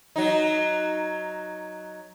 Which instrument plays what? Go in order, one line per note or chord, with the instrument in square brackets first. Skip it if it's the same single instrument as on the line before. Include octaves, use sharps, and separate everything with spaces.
[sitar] F#3 D#4